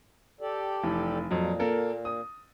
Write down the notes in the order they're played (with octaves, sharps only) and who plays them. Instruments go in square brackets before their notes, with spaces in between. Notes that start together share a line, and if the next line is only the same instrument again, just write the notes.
[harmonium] G4 A4 D5
[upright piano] F1 E3
[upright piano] F2 F#3 [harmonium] A#2
[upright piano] A#3 A4 A#4
D#6